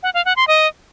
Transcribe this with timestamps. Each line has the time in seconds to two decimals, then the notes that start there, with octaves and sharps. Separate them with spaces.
0.03 F#5
0.14 F5
0.25 F#5
0.36 C6
0.48 D#5